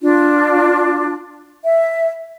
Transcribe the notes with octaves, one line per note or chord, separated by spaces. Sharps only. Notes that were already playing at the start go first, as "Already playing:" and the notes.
D4 F4
E5